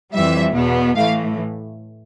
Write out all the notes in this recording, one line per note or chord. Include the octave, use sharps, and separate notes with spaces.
F2 E3 G3 E5
E2 B2 B3
A2 E3 A3 F5